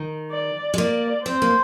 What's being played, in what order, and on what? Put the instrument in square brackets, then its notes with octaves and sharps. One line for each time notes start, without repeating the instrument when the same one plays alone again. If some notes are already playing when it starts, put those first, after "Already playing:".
Already playing: [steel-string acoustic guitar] D#3
[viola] D5
[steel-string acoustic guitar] G#3
[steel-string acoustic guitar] A#3 [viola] D5
[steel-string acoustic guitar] C4 [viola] C5
[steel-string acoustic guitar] A#3